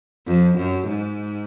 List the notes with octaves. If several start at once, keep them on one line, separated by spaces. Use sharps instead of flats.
F2
F#2
G#2